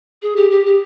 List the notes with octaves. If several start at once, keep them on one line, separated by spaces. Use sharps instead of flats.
G#4
G4
G4
G4